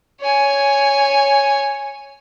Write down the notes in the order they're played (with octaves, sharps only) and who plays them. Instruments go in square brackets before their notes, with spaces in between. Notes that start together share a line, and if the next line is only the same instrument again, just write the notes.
[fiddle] C#5 G#5